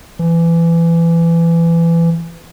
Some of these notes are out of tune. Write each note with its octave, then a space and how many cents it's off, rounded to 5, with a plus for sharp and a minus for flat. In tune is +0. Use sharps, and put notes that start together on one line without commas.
E3 +25